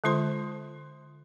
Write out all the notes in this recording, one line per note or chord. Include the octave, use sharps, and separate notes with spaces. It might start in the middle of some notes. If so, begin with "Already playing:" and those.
D3 G#3 F4 C5 C6